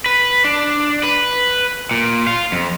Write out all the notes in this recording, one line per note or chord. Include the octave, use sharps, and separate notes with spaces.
B4
D4
B4
A#2
F4
F2